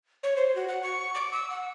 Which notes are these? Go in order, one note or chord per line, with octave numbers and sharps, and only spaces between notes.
C#5
C5
F#4
F#5
C#6
D6
E6
F#5